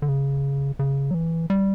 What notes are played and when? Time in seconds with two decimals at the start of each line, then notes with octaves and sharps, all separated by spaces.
0.02 D3
0.08 C#3
0.79 C#3
1.11 F#3
1.14 E3
1.50 G3